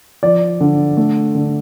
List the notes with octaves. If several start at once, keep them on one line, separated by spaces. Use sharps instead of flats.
F3 D5
D3
A3
D3